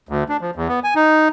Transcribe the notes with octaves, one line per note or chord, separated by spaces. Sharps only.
D2
D4
F3
E2
B3
G#5
D#4